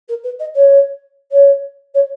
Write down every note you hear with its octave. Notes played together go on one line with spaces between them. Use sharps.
A#4
B4
D#5
C#5
C#5
C#5